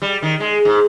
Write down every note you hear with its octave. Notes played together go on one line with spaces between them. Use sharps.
G3
D#3
G#3
G#2